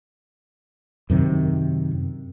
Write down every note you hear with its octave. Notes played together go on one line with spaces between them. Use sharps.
F#2 C3 D#3